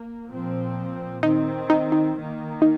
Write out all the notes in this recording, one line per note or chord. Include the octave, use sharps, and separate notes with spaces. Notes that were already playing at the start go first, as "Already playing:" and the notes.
Already playing: A#3
A#2 F3 C4
D#3 C4 D#4
D#4
D#4
D#3 A#3
D#4